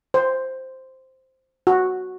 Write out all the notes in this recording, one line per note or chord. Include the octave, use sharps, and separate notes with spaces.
C5
F#4